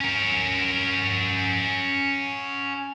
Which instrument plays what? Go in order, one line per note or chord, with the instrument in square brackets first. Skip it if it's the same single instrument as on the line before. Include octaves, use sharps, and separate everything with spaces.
[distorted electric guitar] C#4 A#4